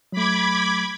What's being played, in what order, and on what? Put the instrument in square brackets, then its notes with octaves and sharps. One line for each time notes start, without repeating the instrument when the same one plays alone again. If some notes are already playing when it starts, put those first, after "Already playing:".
[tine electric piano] F#3 A3 [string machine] B5 D6 G#6